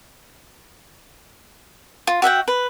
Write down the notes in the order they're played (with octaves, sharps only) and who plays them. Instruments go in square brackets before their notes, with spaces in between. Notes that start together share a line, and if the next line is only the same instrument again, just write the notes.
[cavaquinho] F4
F#4 E5 F#5 G5
B4